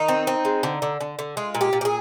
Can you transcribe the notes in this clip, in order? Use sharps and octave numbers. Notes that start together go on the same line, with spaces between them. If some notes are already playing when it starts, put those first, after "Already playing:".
Already playing: D#3 D#4
C4
C4
G#3
D3
D3
D3
D3
G#3 F4
A#2
G4
A#2
G4
G#4